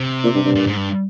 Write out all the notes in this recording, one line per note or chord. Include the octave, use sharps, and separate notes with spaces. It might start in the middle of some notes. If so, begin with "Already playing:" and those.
Already playing: C3
A#2
G2
G2
A#2
G#2
G2